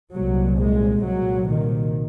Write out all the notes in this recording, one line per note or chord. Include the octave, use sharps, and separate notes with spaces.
C2 A#2 F#3
G#3
C2 A#2 F#3
D#3